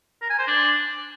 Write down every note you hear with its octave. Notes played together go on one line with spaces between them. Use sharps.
A#4
G#5
C5
D4